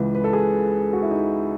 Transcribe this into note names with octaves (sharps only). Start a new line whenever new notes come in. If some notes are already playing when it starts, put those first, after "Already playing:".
Already playing: C#2 C#3 E3 B4
B4
A4
G#4
F#4
E4
D#4